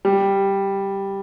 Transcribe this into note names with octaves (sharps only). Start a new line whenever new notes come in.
G3